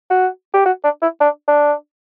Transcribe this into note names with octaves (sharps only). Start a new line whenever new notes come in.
F#4
G4
F#4
D4
E4
D4
D4